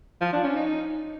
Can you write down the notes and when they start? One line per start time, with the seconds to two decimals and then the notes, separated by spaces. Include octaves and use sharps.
0.21 F3
0.33 D4
0.44 C#4
0.56 D#4